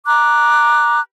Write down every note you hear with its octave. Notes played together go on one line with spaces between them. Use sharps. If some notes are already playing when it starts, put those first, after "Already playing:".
A#5 D6 F#6